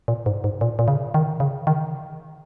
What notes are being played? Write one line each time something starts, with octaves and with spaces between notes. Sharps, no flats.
A#2
G#2
G#2
A#2
A#2
C#3
D#3
C#3
D#3